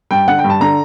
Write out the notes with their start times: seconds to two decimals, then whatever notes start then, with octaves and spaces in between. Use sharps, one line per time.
0.11 G2 G5
0.27 D3 F#5
0.39 G5
0.44 G2
0.50 A5
0.61 D3 A#5